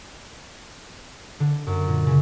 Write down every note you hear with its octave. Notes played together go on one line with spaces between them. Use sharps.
D3
F#2
A#2
C#3